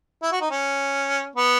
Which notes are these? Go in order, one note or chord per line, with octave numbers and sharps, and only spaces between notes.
E4
F#4
D#4
C#4
B3